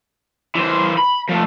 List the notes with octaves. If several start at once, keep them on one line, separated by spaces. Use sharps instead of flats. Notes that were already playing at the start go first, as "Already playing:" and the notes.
E3 C5
B5
F3 A3